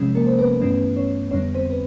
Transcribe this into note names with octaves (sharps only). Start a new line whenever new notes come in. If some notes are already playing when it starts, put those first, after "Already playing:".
Already playing: C3 F3 G#3 C#4
A#3 A#4
C5
B3 B4
G2 E3 A3 B3 C#4 B4
C#4 C#5
F2 D3 G3 B3 C#4 C#5
C4 C5
B4